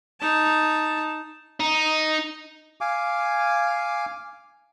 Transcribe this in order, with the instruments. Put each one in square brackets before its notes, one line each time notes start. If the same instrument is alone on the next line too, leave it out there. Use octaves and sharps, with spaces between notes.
[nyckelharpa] D#4 A5
[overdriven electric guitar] D#4
[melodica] F5 G#5 D6